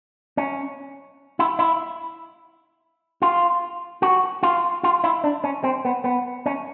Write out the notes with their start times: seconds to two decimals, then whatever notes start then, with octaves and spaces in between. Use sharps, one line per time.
0.37 C#4
1.39 E4
1.59 E4
3.22 F4
4.02 F#4
4.43 F4
4.83 F4
5.04 E4
5.24 D4
5.44 C#4
5.64 C4
5.85 B3
6.04 B3
6.46 C#4